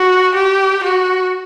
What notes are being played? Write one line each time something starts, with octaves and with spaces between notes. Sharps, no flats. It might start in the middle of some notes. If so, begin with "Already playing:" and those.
Already playing: F#4
G4
F#4